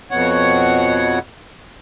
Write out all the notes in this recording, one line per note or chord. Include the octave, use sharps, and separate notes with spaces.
F2 B2 C#5 F#5